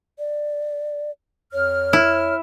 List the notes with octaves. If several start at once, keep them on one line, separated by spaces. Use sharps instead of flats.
D5
F2 C#5 F6
E4